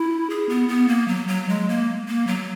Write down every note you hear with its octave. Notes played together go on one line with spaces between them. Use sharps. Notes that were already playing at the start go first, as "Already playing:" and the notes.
Already playing: E4
G#4
B3
B3
A#3
F#3
F#3
G#3
A#3
A#3
F#3